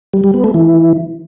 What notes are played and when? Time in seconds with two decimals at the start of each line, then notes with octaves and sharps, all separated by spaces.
0.13 G3
0.24 G3
0.34 B3
0.44 A3
0.54 E3